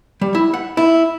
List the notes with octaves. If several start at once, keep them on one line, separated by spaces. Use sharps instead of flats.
G3
E4
F#5
E4